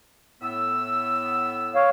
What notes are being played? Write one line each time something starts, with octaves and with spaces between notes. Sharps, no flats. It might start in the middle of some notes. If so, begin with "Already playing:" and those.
A2 B3 E6
C#5 F5